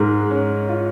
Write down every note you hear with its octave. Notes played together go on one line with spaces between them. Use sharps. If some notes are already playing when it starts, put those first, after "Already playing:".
Already playing: G#2 G#3 A#4
C#4
F4